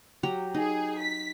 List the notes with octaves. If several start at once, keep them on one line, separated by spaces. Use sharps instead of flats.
F#3 G4 A#5
D#4 G#4
B6